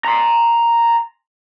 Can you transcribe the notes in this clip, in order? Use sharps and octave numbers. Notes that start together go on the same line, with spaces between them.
A#5 C6